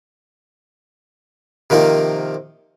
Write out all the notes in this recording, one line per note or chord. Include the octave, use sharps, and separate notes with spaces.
C3 D#3 F3 A#3